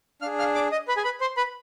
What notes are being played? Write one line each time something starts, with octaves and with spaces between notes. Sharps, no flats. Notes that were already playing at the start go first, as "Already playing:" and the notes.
D4 G#4 F5 F6
F5 F6
D5 D6
D#5 D#6
B4 B5
G#4 G#5
B4 B5
C5 C6
B4 B5